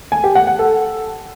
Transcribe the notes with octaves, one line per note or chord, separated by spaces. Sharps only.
G#5
G4
F#5
F#5
A4